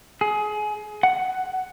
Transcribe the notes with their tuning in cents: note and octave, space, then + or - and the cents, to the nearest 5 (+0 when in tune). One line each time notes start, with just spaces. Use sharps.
G#4 +25
F#5 +10